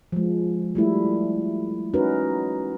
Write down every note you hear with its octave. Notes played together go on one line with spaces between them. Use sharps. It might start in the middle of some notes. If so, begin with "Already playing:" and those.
F3 G#3
G3 A3 E4
C#4 D#4 F#4 A#4 B4